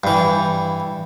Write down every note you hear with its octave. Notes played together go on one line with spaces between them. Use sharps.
G2 E3